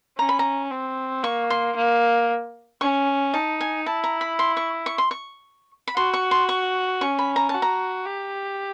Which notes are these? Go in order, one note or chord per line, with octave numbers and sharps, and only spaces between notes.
C#4 A#5
B5
A#5
C4
A#3 C#6
C6
A#3
C#4 C#6
D#4 A5
G#5
E4 A5
A#5
B5
C6
C#6
C#6
C6
C#6
B5
F#4 C6
C#6
C6
C#6
C#4 C#6
B5
A#5
F#4 A5
A#5
G4